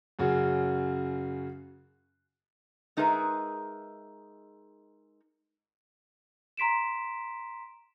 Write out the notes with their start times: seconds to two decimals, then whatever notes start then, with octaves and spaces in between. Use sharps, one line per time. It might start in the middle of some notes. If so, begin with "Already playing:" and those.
0.19 F#2 C#3 F#4
2.97 G#3 D#4 G#4 A#4 B4 E5
6.57 A#5 C6 B6 D7 E7